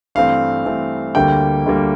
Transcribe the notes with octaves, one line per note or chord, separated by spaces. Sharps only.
G2 E3 A3 C4 F5
G2 E3 A3 C4
D2 D3 G3 A#3 G5
D2 D3 G3 A#3